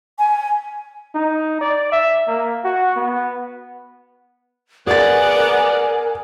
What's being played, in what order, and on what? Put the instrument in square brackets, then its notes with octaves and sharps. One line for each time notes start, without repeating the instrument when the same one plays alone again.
[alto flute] G#5
[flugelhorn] D#4
D5
E5
A#3
F#4
B3
[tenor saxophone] B3 [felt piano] G#4 A6 [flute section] A#4 G#5 [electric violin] D5 F#5